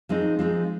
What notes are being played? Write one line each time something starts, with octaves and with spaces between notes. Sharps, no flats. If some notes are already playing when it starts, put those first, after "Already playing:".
F3 G#3 C4 D#4
F3 G#3 C4 D#4